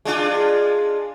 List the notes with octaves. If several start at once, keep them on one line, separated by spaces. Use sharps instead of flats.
G#3 D4 F4